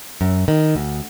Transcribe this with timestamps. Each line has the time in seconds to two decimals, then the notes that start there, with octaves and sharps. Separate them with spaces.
0.21 F#2
0.48 D#3
0.75 D2